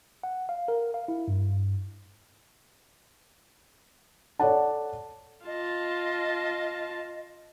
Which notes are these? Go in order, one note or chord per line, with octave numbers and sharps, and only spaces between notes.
F#5
F5
A#4
F5
E4
G2
A4 C#5 D5 F#5 A5
F4 D#5 A5